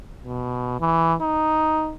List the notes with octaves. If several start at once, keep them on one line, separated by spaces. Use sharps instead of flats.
B2
E3
D#4